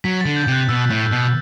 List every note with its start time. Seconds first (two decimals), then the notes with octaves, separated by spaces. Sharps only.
0.04 F#3 B6
0.21 D3 A6
0.36 G6
0.47 C3 F#6
0.69 B2 E6
0.90 A2
1.11 B2